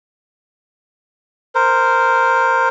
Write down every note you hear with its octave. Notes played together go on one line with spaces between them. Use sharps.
A#4 C5